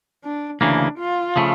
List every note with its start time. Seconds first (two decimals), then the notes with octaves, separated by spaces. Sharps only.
0.24 D4
0.61 D2 C#3 E3 A#3 D4
0.98 F4
1.36 C#3 F3 A3